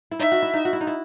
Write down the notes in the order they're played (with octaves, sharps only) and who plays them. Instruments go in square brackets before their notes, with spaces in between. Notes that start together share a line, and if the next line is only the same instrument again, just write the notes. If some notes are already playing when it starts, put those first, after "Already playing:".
[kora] E4
[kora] D#4 [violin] E5
[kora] F#4
E4
D#4
F#4
E4
D#4
E4